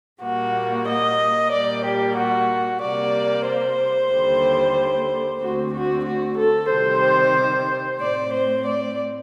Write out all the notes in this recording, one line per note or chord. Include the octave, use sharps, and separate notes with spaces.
A#2 G3 A#3 F#4
D#5
A#2 G3 A#3 D5
G4
F#4
C3 G3 A#3 D5
C5
D#2 D3 G3
D2 D3 A3 C4 F#4
F#4
F#4
A4
C3 D#3 G3 C4 C5
A2 A3 C4 D5
C5
D5